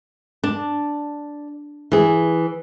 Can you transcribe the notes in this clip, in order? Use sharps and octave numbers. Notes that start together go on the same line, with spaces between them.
D4
E3 G#4